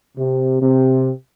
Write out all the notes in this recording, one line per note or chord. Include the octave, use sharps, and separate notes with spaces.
C3
C3